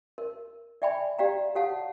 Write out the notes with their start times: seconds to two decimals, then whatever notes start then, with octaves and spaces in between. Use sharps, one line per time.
0.18 A#4
0.82 D5 E5 G5 G#5 B5
1.18 G4 D5 F5 G5 A#5
1.55 G4 A4 C#5 F5 F#5 A5